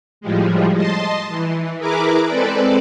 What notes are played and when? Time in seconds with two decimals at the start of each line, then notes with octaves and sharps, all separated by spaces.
0.21 A2 F3 G3 G#3
0.76 D#5 A5 C6
1.29 E3
1.78 E4 G#4 A#4 B4 A#5 D6
2.27 G#3 C4 A4 B4 D5